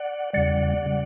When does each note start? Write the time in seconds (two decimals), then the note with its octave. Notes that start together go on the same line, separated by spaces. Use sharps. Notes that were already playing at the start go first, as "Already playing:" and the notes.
Already playing: D5 F#5
0.33 E2 C#3 G3 D5 F#5
0.86 C#3 G3